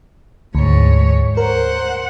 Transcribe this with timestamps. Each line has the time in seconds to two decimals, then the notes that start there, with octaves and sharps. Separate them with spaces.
0.55 D2 G#2 C#5
1.37 A#4 C5 F#5